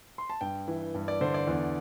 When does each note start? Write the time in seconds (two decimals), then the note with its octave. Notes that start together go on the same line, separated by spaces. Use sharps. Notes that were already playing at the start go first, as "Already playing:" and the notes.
0.18 C6
0.30 A5
0.41 G2 G5
0.68 E3
0.94 G2
1.08 D5
1.21 D3 C5
1.34 D5
1.47 E2